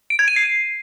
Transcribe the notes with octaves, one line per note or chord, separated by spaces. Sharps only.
D7
G#6
D#7
C7